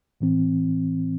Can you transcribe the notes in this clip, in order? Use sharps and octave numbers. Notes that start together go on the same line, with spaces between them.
A2 E3 C4